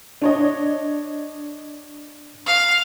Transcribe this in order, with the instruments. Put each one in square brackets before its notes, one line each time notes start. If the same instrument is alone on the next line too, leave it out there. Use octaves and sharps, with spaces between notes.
[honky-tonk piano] D4 C#5 D#5
[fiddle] F5